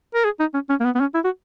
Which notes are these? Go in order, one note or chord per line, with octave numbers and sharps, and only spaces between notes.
A#4
G#4
D#4
C#4
C#4
A#3
B3
B3
C#4
E4
F#4